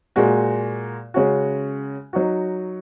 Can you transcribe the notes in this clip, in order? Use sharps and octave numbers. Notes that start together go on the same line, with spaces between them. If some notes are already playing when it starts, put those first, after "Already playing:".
A#2 G#3 F#4
C#3 G#3 C#4 F#4
F#3 D#4 F#4